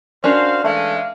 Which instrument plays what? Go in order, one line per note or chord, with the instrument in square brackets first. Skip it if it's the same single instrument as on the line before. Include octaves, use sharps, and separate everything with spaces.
[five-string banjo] C#4 D4 A#4 [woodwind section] F#4 F5 [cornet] C5
[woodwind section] E3 G#3 [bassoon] A3 [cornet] F5